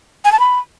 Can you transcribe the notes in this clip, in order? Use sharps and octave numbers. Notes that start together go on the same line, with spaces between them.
G#5
A5
B5